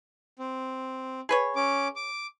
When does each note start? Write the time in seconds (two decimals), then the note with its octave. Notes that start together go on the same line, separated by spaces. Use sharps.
0.39 C4
1.29 G#4 B4 C#5
1.56 C#4 D6
1.96 D6